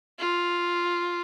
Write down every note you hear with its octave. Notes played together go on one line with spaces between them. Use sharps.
F4